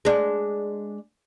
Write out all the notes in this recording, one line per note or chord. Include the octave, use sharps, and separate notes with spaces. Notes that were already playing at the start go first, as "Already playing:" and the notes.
G#3 D4